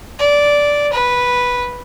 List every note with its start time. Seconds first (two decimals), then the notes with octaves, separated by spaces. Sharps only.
0.19 D5
0.93 B4